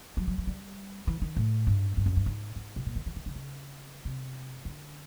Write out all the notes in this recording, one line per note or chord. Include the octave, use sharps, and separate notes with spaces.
F#3
F#3
F#3
G3
E3
D#3
A2
G2
G2
F#2
G2
G#2
G#2
B2
A#2
D#3
E3
D#3
D3
C#3
C3
D3